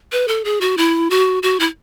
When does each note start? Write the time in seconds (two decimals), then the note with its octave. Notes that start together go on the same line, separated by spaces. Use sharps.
0.12 B4
0.28 A4
0.45 G#4
0.61 F#4
0.77 E4
1.10 F#4
1.43 F#4
1.60 E4